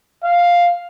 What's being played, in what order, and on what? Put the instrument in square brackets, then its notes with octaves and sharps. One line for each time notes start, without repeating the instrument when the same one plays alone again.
[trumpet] F5